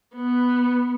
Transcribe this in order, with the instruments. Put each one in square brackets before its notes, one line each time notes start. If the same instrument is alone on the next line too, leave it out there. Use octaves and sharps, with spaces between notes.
[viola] B3 [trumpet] B4